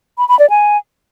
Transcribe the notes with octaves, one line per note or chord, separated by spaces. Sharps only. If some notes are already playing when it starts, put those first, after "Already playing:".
B5
B5
D5
G#5